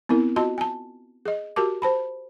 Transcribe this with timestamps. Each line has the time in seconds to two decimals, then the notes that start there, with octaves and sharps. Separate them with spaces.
0.09 B3 C4 E4 A#4
0.36 F4 F#4 D#5 A5 C6
0.58 G#5 A5
1.25 G#4 D#5
1.56 F#4 G4 A#4 A5 D6
1.82 C5 A5 B5